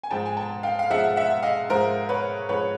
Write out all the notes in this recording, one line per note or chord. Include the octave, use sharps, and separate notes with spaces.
G#5
G#2 F3 G#3 G5 A5
G#5
G5 A5
F5 G5
F5
G#2 F3 G#3 E5 F#5
E5 F#5
D#5 F5
G#2 F3 G#3 A#4 C5
B4 C#5
G#2 F3 G#3 B4 C#5